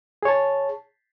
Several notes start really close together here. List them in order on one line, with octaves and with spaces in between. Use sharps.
G#4 C#5 A5